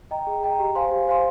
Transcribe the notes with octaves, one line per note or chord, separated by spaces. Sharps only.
D#5 G5 A#5
G#4
D#5 G5 A#5
G4
C5 F5 G#5 C6
G4
C5 F5 G#5 C6